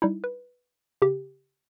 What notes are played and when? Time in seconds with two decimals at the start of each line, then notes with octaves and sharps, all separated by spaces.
0.02 G3 D#4 E4
0.24 B4
1.02 C#3 G4